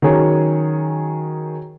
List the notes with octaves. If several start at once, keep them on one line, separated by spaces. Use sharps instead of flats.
D#3 F#3 C#4 G#4 C#5